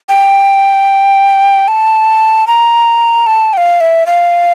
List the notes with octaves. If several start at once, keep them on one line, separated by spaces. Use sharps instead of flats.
G5
A5
A#5
A5
G5
F5
E5
F5